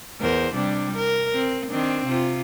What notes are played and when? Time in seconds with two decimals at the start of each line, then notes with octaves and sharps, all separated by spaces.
0.21 E2 A#4 C5
0.54 C3 G3 D4
0.96 A#4
1.33 C4
1.70 D#3 C4 D4
2.05 C3 F4